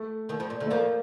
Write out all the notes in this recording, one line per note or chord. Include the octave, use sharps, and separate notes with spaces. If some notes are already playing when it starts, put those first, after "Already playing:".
Already playing: A3
D#2 D#3
F2 F3
A#2
D2 D3
A3
F2 F3 A#3